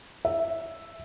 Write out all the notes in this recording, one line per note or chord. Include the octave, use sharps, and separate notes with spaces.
E5